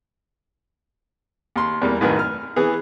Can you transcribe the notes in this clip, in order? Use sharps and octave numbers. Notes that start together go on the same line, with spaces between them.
D#2 C6
E2 G3 A#3
A1 F#2 D#3 B4
F6
E3 B3 G#4